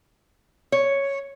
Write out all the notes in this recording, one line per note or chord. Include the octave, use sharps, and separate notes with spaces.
C#5